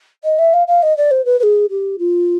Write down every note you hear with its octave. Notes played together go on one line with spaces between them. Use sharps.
D#5
E5
F5
F5
D#5
D5
C5
B4
B4
G#4
G4
F4